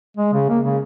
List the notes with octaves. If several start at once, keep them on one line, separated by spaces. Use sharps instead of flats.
G#3
C#3
A#3
C#3